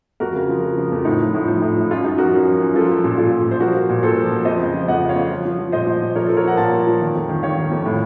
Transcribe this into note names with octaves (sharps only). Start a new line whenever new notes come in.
F2 F#4 A#4
C#3
F3
C#3
F3
F2
A2 D#4
F3
A2
F3 D#4
A2
F3
F#2 F4
F#2 D#4 F#4
F3 F#4 A#4
F#2
F3
F#2
F3 F4 A4
F3
A#2
A#2 F4 A4
A#2
A#2 C5
F3 F#4 A#4
F3
A#2
A#2 A4 C5
F3
F3
F2 C5 D#5
C#3
F3
F2 D#5 F#5
C#3
C#5 F5
F2
F3
F3
F3
A#2 C5 D#5
F3
A#2
F3 A#4 C#5
A4 C5
F3
A#4 C#5
F3 F#5 A#5
A#2 F5 A5
F3
F3
D#3
F2
D#3
D#3 C#5 F5
D#3
F2
A2